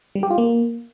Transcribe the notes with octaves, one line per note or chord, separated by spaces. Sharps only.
G3
G4
F4
A#3